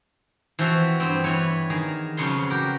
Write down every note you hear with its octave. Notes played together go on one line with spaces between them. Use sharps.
E3 F3 C4 F#4 E5
G2 B3 C4
E3 B4 C#5
D#3 G#4 A#4
F2 C#3 F#3 B3 C#5 C6
F#4 G4 A#4